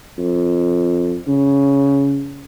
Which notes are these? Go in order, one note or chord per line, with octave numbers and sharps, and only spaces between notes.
F2
C#3